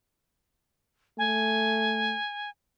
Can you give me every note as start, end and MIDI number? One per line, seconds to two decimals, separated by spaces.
1.18 2.16 57
1.18 2.50 80